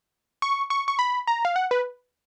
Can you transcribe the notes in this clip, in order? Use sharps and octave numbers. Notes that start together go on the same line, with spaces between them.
C#6
C#6
C#6
B5
A#5
F5
F#5
B4